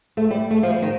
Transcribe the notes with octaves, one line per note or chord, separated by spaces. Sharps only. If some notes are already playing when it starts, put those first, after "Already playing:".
A3
G3
A3
F3
G3
D#3